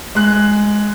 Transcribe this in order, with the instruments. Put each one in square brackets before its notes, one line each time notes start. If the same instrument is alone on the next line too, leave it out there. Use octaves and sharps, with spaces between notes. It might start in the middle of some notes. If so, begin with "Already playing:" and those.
[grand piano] G#3 F#6